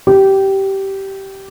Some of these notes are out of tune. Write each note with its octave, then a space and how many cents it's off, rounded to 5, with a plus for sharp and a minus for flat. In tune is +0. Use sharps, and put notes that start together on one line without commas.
G4 -15